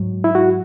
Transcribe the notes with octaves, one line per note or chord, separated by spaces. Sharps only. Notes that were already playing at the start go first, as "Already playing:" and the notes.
Already playing: G#2 F#3
E4
F#4